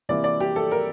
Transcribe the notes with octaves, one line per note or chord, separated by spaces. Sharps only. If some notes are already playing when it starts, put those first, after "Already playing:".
C3 E3 A#3 D5
D5
G4
A4
A#4